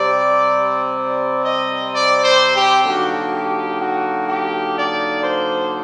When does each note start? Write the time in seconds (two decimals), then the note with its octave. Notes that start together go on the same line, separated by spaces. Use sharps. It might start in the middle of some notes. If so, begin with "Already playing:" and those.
Already playing: C3 G3 C4 D5
0.95 D5
1.42 D#5
1.90 D5
2.21 C5
2.53 G4
2.84 D3 F#3 A#3 D#4 F#4
3.32 G4
3.79 F#4
4.27 G4
4.74 D5
5.21 C5